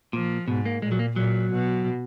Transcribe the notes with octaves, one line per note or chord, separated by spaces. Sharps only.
A#2 F3
G#2 B2
A#3
A#2 G#3
F#3
A#3
A#2 F#3
B2